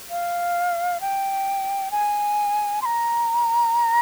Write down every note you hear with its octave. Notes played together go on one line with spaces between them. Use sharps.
F5
G5
G#5
C6
A#5